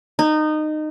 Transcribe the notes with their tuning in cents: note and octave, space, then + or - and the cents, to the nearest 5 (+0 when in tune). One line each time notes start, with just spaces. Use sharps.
D#4 -20